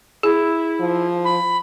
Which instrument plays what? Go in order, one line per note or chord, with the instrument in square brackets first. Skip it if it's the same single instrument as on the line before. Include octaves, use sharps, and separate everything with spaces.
[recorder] E4 [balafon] G#4
[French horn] F3
[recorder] B5